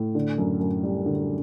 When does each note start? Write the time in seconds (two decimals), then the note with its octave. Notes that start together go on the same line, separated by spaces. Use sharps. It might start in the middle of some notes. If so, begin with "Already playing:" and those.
Already playing: A2
0.15 D3
0.38 F#2
0.61 F#2
0.83 G3
1.06 D3